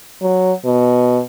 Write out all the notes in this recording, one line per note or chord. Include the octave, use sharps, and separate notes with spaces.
F#3
B2